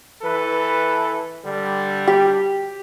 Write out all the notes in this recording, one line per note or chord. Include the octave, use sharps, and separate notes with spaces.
E3 A4 B4
D3 G3
G4